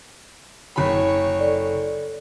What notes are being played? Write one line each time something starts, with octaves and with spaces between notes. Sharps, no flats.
F#1 C#5 B5
A4 D5